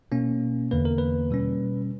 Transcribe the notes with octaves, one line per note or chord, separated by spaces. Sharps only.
B2 A#3 C#4
E2 D3 A#3 B4
A#4
B4
B2 G3 C#4